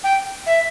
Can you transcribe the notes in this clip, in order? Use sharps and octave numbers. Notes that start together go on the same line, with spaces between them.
G5
E5